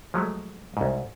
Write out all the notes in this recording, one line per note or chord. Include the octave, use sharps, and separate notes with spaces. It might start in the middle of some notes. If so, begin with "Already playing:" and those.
F3 F#3 G#3 A3
C2 G#2